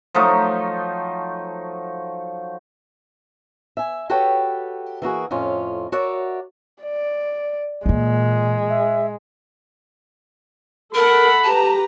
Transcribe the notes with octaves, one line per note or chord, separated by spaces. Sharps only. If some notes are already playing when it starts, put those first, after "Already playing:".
F3 F#3 A3 D#4
E5 G#5
F#4 G4 A4 B4 C#5 G5
E3 A#3 F#4 G#4
F2 A2 C#4 F4
F#4 A#4 C#5 D5 E5 F#5
D5
A#2 E3 G#3 A#3
E5
A4 A#4 F#5 B5
G4 B4 A5 A#5